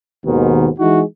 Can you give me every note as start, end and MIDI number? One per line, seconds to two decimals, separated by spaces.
0.25 0.69 39
0.25 0.69 44
0.25 0.69 47
0.25 0.69 51
0.78 1.02 52
0.78 1.02 56
0.78 1.02 63
0.78 1.02 64
0.78 1.02 66